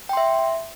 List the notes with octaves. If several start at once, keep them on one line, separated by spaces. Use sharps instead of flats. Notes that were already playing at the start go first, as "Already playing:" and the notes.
E5 G5 C6